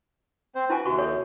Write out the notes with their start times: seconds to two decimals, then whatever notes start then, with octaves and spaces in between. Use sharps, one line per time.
0.55 C4 C5
0.70 E4 F#4 B4 G#5
0.86 D#2 C3 F#4 C#6
0.99 A4 C#5